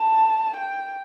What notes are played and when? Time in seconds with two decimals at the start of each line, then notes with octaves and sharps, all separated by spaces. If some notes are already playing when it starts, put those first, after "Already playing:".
Already playing: A5
0.56 G5